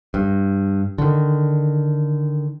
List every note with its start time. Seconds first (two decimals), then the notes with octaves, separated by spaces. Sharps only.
0.14 G2
0.98 D3 D#3